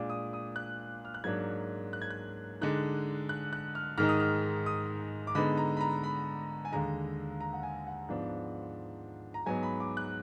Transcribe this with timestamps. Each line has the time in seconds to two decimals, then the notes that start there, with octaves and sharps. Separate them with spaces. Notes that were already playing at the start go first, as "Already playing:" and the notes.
Already playing: A#2 G#3 D4 D6
0.09 D#6
0.33 D#6
0.56 F#6
1.05 F6
1.14 F#6
1.24 G#2 F#3 A#3 D4 G#6
1.93 F#6
2.02 G#6
2.10 F#6
2.61 D3 G#3 D#4 F#6
3.29 F#6
3.53 F#6
3.75 F6
3.98 G#2 D#3 G#3 D#4 F6
4.09 D#6
4.20 F6
4.66 D#6
5.27 D6
5.35 D3 G#3 B3 D#4 B5
5.58 A#5
5.77 B5
5.81 A#5
6.03 B5
6.65 G#5
6.72 D#2 D3 G#3 A#5
7.40 A#5
7.53 F#5
7.63 G#5
7.87 F#5
8.09 G#2 F3 B3 D4
9.34 A#5
9.46 G#2 F#3 B3 D#4 G#5
9.63 B5
9.80 D6
9.97 F#6